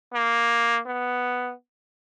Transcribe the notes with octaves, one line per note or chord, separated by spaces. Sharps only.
A#3
B3